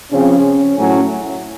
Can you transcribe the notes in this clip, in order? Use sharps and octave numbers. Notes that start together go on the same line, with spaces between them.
C#3 F3 C4 C#4
A2 F#3 A3 C#4